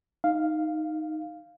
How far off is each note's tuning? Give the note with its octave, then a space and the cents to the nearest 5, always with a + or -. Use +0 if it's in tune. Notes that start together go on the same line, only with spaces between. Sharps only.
D#4 +0 F5 +0